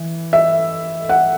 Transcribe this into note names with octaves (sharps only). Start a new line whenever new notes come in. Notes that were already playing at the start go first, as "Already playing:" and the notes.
Already playing: E3
E5
F#5